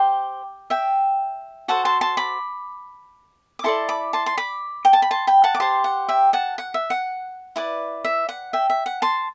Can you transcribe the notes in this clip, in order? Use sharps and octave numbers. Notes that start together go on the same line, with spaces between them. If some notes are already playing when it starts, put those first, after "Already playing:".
Already playing: G4 C5 G5
E5 G5
F#4 A4 C5 F#5 A5
A5 C6
A5 C6
B5 D6
D6
E4 A4 D5 A5 C6
B5 D6
A5 C6
C6
B5 D6
G5
A5
B5
A5 C6
G5 B5
F#5 A5
D6
G4 C5 A5 C6
F#5
E5 G5
F#5 A5
F#5
E5
F#5
E4 B4 D5
E5
F#5
E5 G5
E5
F#5
A5 C6